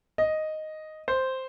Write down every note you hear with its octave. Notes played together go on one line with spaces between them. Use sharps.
D#5
C5